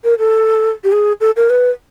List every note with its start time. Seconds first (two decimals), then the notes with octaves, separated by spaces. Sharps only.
0.04 A#4
0.19 A4
0.84 G4
0.92 G#4
1.21 A4
1.36 A#4
1.50 B4